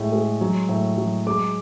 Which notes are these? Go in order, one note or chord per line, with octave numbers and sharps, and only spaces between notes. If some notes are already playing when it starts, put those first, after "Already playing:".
Already playing: A2 G#3
G#3
F#3
A2
F#3
G#3 D6